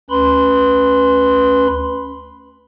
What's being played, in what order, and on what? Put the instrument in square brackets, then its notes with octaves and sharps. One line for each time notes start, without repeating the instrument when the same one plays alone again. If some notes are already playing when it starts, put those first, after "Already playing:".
[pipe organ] D2 C#4 B4 B5 C6